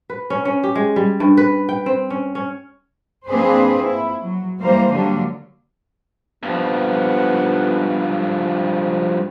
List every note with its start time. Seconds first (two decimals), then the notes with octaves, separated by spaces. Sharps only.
0.10 B4
0.30 C#4
0.45 C#4
0.63 G4
0.75 G#3
0.96 G3
1.20 G2
1.37 B4
1.69 G5
1.86 C4
2.10 C#4
2.35 C#4
3.28 A#3 C4 D4 G#4 B4 C5
3.82 E4
4.22 F#3
4.60 E3 F#3 G3 A#3 A#4 C5
4.90 D3 F#3 G3 A#3 D4
6.43 G2 F3 B3